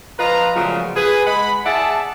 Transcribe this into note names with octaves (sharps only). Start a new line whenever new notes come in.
F3 F4 B4 D#5 A#5
A#2 C#3 F3 F#3 G#3 A3
G#4 B4
G#3 F#5 B5
G#4 D5 E5 F#5 A5